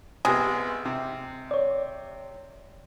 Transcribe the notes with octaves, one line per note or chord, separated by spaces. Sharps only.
C2 G#3 B3 G4 G#5
C3
C#5 D5